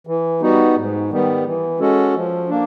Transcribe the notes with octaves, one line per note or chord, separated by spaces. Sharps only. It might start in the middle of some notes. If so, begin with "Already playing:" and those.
E3
G3 B3 D#4 F#4
G#2
D#3 G3 B3
E3
G#3 C#4 F#4 A4
F3
A#3 D4